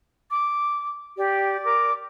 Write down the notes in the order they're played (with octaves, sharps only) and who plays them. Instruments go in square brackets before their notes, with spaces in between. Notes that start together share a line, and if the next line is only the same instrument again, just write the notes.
[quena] D6
[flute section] G4 [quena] D5
[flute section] A#4 D6